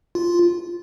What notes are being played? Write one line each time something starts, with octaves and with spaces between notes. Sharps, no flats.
F4